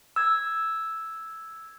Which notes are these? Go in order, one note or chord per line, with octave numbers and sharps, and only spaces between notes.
E6 G#6